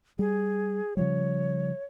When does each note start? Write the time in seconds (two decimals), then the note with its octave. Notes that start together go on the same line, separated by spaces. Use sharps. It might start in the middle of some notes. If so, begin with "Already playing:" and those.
0.19 G3 G#4
0.97 C#3 F3 G3 C#5